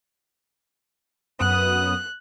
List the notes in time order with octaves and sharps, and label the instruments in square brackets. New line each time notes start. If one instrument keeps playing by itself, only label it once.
[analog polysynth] F#2 B3 D#6 [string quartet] F#6